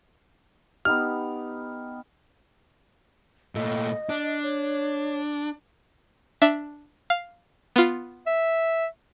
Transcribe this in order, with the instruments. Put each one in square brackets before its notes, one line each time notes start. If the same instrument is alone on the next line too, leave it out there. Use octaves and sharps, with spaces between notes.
[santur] B3 D#4 G4 [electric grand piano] F6
[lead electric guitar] A#2 A3 [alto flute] D#5
[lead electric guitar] D4
[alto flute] C#5
[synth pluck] D4 E5
F5
B3 F4
[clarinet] E5